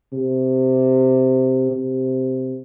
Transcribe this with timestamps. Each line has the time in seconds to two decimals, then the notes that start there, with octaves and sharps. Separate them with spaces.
0.13 C3
1.71 C3